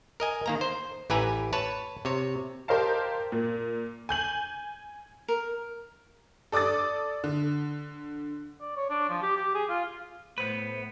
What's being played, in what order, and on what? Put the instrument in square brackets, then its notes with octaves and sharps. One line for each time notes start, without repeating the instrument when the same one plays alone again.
[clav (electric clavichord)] A#4 D#5 G#5
D#3 A#3 A#5
C5
A1 E3 G4 B4 G#5 A#5
B4 C#5 A5
C3 C#5
[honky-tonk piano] G4 A#4 C5 D#5 F5 A5
A#2
G#5 G6 F#7
[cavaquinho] A#4
[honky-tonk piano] A4 D5 D6 D#6 A6
D3
[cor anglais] D5
C#5
D4
F3
G4
G4
G#4
F4
[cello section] A2 [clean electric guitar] B3 B4 [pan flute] C5